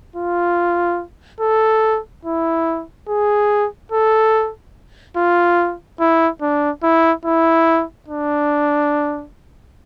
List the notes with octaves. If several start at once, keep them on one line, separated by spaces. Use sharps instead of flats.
F4
A4
E4
G#4
A4
F4
E4
D4
E4
E4
D4